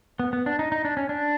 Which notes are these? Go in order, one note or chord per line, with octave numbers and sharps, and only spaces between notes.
B3
B3
D4
D#4
D#4
D4
C#4
D4